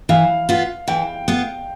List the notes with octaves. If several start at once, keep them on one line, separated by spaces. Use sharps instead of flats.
E3 F5
B3 F4
E3 G5
B3 F4